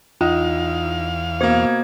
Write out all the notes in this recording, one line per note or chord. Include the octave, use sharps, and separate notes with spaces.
E2 D#4 F4 F5
B2 A#3 C5 G#6